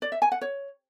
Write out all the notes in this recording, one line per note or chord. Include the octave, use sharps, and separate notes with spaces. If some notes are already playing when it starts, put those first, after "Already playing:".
D5
E5
G#5
F#5
C#5